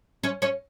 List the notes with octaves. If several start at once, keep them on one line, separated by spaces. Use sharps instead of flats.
C#4 C#5
C#4 C#5